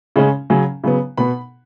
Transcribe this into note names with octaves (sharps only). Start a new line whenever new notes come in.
C#3 G#3 C#4
C#3 F#3 C#4
C#3 F#3 B3
B2 B3 B5